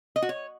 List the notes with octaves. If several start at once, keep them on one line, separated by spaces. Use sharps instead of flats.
D#5
F#4
C#5